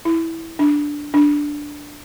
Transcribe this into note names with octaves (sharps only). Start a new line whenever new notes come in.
E4
D4
D4